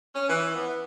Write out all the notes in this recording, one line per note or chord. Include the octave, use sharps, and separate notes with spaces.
C#4
E3
B3